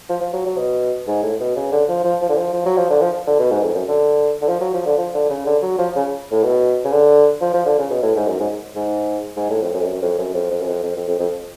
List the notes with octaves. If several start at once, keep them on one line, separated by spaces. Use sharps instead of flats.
F3
F3
F#3
F#3
B2
G#2
A2
B2
C#3
D3
F3
F3
F3
D3
F3
F3
F#3
F3
D3
F3
D3
B2
G#2
F2
F#2
D3
D3
F3
F#3
F3
D3
F3
D3
C#3
D3
F#3
F3
C#3
A2
B2
C#3
D3
F3
F3
D3
C#3
B2
A2
G#2
F#2
G#2
G#2
G#2
A2
F2
F#2
F2
F#2
F2
F#2
F2
F2
F#2
F2
F2
F2
F2
F2